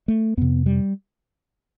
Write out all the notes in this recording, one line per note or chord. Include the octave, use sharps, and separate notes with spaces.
A3
F2 C3 B3
G3